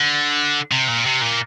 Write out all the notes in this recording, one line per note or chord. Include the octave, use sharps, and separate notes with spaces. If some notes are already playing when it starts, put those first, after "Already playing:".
Already playing: D3
C3
A#2
C3
A#2